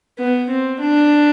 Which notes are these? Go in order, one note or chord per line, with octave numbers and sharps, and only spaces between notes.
B3
C4
D4